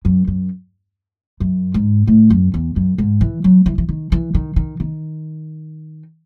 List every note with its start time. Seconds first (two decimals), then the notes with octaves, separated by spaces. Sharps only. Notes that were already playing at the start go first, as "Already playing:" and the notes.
0.05 F#2
0.27 F#2
1.40 F#2
1.74 G#2
2.07 A2
2.30 F#2
2.54 E2
2.76 F#2
2.98 G#2
3.21 E3
3.44 F#3
3.66 E3
3.78 E3
3.89 D#3
4.12 E3
4.35 D#3
4.56 D#3
4.80 D#3